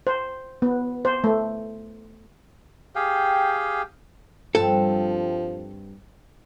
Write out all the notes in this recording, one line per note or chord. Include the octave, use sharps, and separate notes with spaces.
C5
B3
C5
A3
G4 G#4 F5 G5
G2 F3 C4 A4